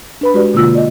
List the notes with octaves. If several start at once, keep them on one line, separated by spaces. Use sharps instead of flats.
D4 B4 B5
G#3 F#4 G4 B4 D5
B2 D3 A#3 F4 E6
A#3 D5 D#5